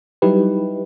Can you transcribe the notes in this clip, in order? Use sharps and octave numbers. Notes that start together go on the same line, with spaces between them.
F#3 G3 D#4 E4 G4 B4